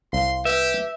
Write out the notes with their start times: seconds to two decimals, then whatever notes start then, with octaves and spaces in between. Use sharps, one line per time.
0.13 C2 F5 C6
0.45 G4 B4 E5